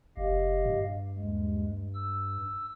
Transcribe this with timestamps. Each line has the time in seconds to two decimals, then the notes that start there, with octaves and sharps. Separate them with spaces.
0.17 F1 G4 D#5 F5
0.65 G2
1.17 D#2 G#3
1.94 E6